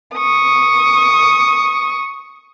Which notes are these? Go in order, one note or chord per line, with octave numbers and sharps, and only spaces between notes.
C#6 D#6